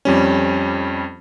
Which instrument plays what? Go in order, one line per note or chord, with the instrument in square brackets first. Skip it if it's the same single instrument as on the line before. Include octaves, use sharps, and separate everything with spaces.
[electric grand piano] F2 G3 C#4